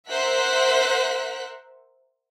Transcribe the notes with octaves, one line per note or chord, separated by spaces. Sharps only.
A#4 C5 E5 F#5 F#6 B6